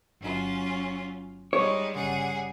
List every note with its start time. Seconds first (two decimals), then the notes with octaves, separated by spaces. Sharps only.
0.21 G1 F#3 C#4 F4
1.53 G3 G#3 D#4 C#5
1.96 G1 C#3 G3 G#4 F#5